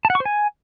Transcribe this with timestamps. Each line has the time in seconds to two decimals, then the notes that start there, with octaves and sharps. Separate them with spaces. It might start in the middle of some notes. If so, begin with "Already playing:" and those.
0.05 A5
0.10 F#5
0.15 C#6
0.20 C5
0.25 G#5